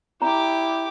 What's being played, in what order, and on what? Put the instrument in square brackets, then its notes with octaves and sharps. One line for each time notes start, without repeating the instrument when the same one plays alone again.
[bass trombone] E4 [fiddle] G4 D6 [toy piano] A#5